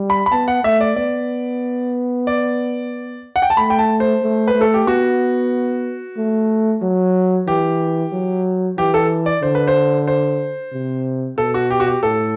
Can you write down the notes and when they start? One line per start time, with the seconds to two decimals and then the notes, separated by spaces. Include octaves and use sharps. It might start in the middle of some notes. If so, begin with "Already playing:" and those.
Already playing: G3
0.10 B5
0.26 B5
0.32 B3 A5
0.48 F#5
0.64 A3 E5
0.81 D5
0.96 B3 D5
2.27 D5
3.36 F#5
3.42 G5
3.50 A5
3.57 A3 B5
3.70 G5
3.79 A5
4.00 C5
4.23 A3
4.48 B4
4.55 A3
4.61 A4
4.74 G4
4.87 B3 F#4
6.17 A3
6.82 F#3
7.47 E3 G4
8.12 F#3
8.78 E3 G4
8.94 A4
9.26 D5
9.43 D3 C5
9.55 B4
9.68 C5
10.08 C5
10.73 C3
11.38 B2 A4
11.54 F#4
11.71 G4
11.80 F#4
11.87 G4
12.03 A2 A4